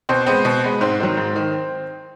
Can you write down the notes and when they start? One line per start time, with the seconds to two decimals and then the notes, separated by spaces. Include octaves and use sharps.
0.09 B2 C4 C5
0.26 G#3 B3 C4 C5
0.45 B2
0.64 G#3 B3
0.81 G#2 C4 C5
1.00 D#3 F#3
1.17 G#2
1.36 D#3